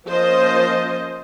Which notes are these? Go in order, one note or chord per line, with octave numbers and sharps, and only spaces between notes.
F3 A#3 C#4 C5 D#5